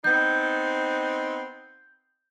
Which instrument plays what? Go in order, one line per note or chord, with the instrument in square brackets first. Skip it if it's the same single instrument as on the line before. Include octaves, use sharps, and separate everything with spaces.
[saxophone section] B3 C4 D#4 [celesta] G6